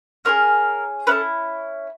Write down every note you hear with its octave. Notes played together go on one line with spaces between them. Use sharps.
C#4 F4 G#4 A#4
C#4 E4 A4 B4